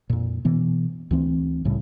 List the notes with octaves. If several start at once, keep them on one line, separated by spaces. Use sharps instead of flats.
F2 A#2
B2 E3 B3
D2 E3 C4
C2 A2 C#3 G3